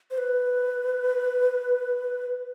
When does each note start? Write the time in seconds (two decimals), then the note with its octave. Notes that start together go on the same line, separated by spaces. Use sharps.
0.11 C5
0.18 B4